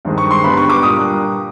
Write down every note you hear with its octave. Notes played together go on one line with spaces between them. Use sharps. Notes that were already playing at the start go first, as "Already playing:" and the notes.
G2 D#3 G#3 C4
C#6
C6
G2 D3 G3 B3 B5
C#6
D6
A#2 G3 A#3 D4 D#6